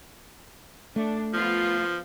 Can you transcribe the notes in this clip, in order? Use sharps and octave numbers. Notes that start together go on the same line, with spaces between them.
A3 D4
F3 B3 F4